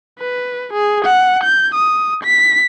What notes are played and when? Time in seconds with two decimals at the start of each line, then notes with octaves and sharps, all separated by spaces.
0.19 B4
0.74 G#4
1.05 F#5
1.44 G6
1.75 D#6
2.24 B6